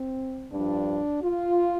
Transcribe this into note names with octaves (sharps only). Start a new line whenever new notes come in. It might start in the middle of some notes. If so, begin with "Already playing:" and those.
Already playing: C4
G2 F3 D4
F4